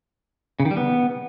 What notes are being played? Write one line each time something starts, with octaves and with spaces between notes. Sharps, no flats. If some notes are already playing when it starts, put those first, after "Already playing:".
C#3
D#3
G3
B3